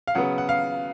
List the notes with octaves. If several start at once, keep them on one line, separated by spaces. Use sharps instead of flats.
F5
C#3 F#3 B3 F#5
F#5
F5